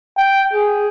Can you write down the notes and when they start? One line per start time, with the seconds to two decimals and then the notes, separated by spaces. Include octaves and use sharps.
0.17 G5
0.53 G#4